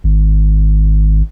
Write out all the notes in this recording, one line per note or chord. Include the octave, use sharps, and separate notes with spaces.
G#1